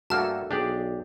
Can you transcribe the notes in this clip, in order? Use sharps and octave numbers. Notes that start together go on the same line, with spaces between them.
G2 A3 A#3 F#4 A4 A5 F6
B1 D4 G4 G#4 D5